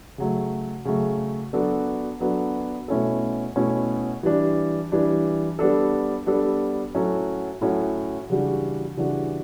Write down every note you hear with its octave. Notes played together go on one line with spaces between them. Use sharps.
C#3 F#3 A3
C#3 F#3 A3
F#3 B3 D4 F#4 A4
F#3 B3 D4 F#4 A4
B2 A3 C#4 E4 A4
B2 A3 C#4 E4 A4
E3 G3 D4
E3 G3 D4
G3 B3 D4 A4
G3 B3 D4 A4
A2 F#3 C#4 F#4 A4
A2 F#3 C#4 F#4 A4
C#3 E3 G3 D4 F#4
C#3 E3 G3 D4 F#4